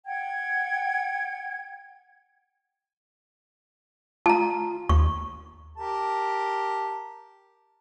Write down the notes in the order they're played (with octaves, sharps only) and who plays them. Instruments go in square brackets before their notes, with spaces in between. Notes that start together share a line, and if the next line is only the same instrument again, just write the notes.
[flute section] F#5 G5 G#6
[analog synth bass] F4 [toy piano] A5 A#5
[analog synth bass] D#2 [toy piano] C#6
[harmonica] G4 A#4 A5